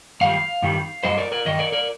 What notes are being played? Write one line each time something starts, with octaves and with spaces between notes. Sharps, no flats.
G2 D#3 G3 F5
G2 D#3 G3
G2 D#3 G3 C5 D#5
A#4 D5
A#4 D5
G2 D#3 D#5
A#4 D5
A#4 D5